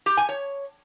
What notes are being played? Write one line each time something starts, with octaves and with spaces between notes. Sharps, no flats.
G4
G#5
C#5